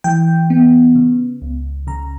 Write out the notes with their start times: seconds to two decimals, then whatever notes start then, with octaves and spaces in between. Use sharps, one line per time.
0.04 E3 G5
0.50 B3
0.95 C#3
1.42 C#2
1.87 C#3 A#5